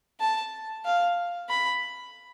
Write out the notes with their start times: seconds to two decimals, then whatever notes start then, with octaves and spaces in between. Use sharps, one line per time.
0.20 A5
0.85 F5
1.49 B5